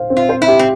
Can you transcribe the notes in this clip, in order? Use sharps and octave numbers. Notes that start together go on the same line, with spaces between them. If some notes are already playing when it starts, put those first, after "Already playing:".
Already playing: C5 F5
C4
F4
C5
E4
G4
C4